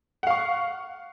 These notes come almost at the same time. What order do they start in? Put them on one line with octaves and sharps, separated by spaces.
F#5 F5 C#6